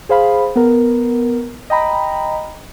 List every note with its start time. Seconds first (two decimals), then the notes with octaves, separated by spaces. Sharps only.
0.09 G#4 C5 F5 B5
0.56 B3 A#4
1.70 D#5 G5 A#5 B5